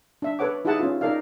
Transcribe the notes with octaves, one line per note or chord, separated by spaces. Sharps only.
D4 E5
A4 B4 C#5 F#5 D6
D#4 E4 G4 G#4 F#5 A5
C#4 F4
D#4 A4 A#4 D5 F5